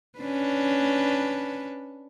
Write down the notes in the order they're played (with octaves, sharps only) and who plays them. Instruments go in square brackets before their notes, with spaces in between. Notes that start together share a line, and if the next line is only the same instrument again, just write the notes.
[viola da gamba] C#4 D4 B4